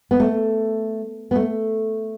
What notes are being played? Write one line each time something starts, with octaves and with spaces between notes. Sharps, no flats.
B3
A3
B3
A3